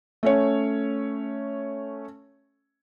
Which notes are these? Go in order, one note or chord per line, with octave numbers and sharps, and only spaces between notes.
A3 C#4 C#5